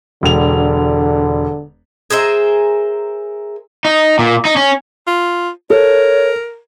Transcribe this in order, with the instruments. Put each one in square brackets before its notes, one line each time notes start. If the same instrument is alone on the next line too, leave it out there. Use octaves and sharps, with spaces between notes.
[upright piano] E1 F7 [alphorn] D3
[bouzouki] G#4 A#4 C5 E5
[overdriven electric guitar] D#4
A#2
D#4
C#4
[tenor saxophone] F4
[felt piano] A4 [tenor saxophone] A#4 [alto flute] C#5